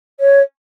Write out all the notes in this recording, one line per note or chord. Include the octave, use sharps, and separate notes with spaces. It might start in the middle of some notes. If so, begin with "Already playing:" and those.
C#5